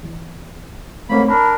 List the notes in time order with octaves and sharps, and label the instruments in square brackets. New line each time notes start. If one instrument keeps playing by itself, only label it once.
[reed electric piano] E2
[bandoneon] G#2 A#3 B5 [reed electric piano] A3 C4 C#5
[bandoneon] D4 A#4 [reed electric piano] B5